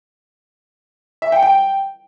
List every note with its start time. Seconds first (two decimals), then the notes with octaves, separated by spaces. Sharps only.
1.22 E5
1.32 G5
1.43 G5